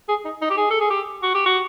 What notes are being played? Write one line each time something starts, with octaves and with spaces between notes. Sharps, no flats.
G#4
D#4
D#4
G4
G#4
A4
G#4
G4
F#4
G4
F#4